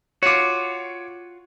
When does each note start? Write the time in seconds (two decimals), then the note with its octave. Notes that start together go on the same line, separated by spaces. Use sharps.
0.23 F4 F#4 C#5 D6